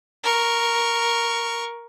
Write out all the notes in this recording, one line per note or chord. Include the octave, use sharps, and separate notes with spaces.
A#4 C#6